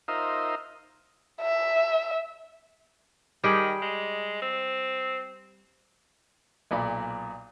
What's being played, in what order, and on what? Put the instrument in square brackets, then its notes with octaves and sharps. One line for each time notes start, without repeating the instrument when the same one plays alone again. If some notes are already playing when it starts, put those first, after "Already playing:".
[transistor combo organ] D#4 F4 A#4 C5 D#5 E5
[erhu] E5
[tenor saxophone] D#3 [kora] G3 G4 G#4
[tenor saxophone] G#3
C4
[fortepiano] B1 A#2 D5 B5